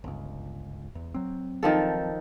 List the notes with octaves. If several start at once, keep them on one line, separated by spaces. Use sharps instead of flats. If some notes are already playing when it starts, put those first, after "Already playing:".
G1 C#2
E2
F#3 C4
D#3 F3 A4